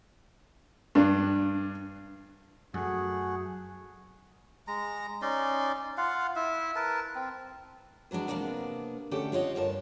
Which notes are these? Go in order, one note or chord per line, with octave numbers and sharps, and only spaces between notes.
G2 D4
F#2 F#3 A3 G#4 F#5
G#3 A#5
C#4 D#4 D5 C6
F4 F5 F#5
E4 E5
A#4 B4 A5
C4
E3 F#3 G#3 D4 F#4
C3 A#3 B3 C#4 D4 A#4
D3 A3 C#4 F#4 G4 G5
D4 F4 C#5 D#5
D2 G2 A#4 A5